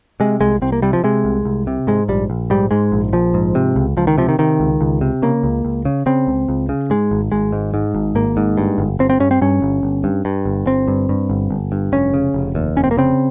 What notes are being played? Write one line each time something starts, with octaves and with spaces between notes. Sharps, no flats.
C3 G#3
C2 G#3
C2 C4
A#3
C3 G3
F3
C3 G#3
C2
C2
C3
G#2 G#3
A#1 G3
A#1
G#2 G3
G#2 G#3
A#1
A#1 F3
G#2
C3
C#2
C#2 F3
D#3
C3 F3
D#3
C3 D#3
C#2
C#2
C3
C#3 A#3
C#2
C#2
C#3
C#3 C4
C#2
C#2
C#3
G#2 G#3
G#1
G#1 G#3
G#2
G#2
G#1
G#1 A#3
G#2
G2
G1
G1 C4
C4
G2 C#4
C4
G2 C#4
G1
G1
G2
G2
G1
G1 C4
G2
G2
G1
G1
G2
F1 C#4
C#3
F1
D#2
F1 C#4
C4
A#3
C#3 C4